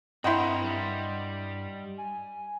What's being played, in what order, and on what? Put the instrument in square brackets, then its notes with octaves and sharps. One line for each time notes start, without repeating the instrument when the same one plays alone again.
[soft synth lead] G2 [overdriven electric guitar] C4 A#4 [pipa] E4 G5 [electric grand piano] D#5 F#5 C6
[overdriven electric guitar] G3
[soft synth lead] G#5